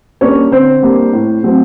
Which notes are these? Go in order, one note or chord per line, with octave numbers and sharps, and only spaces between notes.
G3 A#3 C#4 D4 C#5
D3 C4 C5
G3 A#3 D4
A2
F#3 A3 C4